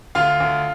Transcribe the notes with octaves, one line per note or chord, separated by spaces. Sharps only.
D2 F4 F5
D2